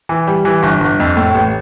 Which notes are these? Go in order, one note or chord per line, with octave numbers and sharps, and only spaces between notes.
E3
G3
E3
G1
G1
F2
A2
A1